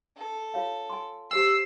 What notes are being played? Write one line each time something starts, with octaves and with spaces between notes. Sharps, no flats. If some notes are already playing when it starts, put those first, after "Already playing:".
A4
F4 C#5 F5
G#5 C6
G4 C5 G#5 E6 C7